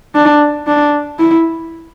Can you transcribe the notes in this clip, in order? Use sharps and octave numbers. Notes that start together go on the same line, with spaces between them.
D4
D4
E4